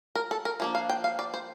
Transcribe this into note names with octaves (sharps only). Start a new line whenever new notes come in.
A#4
A4
A#4
F3 A#3 D4
F5
G5
F5
D5
C5